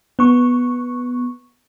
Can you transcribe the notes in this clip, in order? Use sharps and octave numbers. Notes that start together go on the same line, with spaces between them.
B3 C#6